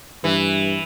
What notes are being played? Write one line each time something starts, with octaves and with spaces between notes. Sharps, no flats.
G2 E3